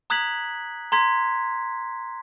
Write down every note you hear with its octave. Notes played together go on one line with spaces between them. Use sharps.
A#5 D#6 F#6 G#6 B6 F#7
A#5 C6 G#6 B6